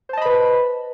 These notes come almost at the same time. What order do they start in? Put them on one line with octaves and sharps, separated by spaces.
C5 A5 D#5 B5 B4